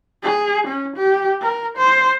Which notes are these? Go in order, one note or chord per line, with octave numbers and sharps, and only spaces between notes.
G#4
C#4
G4
A#4
C5